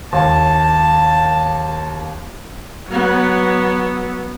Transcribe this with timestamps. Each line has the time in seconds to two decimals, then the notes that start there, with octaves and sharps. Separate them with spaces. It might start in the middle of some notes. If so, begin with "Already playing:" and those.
0.13 D#2 A5
2.89 F#3 B3